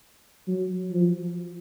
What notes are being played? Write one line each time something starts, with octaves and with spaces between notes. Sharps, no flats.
F#3
F3